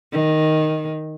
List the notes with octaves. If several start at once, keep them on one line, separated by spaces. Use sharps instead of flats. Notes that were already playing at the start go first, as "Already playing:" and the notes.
D#3